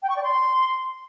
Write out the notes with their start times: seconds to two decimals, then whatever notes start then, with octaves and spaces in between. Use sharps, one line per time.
0.02 G5
0.09 C#6
0.16 D5
0.23 C6